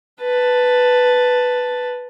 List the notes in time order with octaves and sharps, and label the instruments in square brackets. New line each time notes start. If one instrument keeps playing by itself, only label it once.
[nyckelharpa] B4 A5